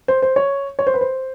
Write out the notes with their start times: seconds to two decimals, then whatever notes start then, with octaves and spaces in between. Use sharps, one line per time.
0.08 C5
0.22 C5
0.36 C#5
0.79 C#5
0.87 C5
0.94 B4
1.01 C5